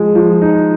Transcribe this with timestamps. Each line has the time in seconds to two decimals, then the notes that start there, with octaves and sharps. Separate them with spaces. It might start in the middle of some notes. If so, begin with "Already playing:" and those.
Already playing: F3 G#3
0.15 F3
0.42 D#4